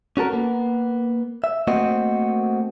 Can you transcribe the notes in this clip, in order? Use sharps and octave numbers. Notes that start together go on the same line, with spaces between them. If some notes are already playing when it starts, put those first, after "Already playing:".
C#4 F#4 A4 A#4
A#3 B3
E5
A3 A#3 C4 F#4 C5 D#5